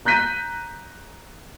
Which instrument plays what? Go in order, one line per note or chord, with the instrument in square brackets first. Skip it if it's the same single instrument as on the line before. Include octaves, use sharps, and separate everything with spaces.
[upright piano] A#5 F#6 G6 B6 D#7